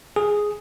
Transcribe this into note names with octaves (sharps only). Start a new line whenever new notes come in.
G#4